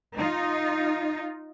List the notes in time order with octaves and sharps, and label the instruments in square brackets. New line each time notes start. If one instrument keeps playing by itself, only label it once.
[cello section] D#4 F4